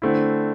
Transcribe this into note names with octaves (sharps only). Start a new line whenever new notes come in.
D3 A3 C4 E4